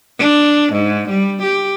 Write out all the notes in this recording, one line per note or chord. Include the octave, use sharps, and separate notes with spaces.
D4
G#2
G3
G4